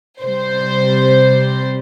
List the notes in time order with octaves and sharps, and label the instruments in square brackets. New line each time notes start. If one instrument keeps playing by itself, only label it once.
[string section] C3 G3 C5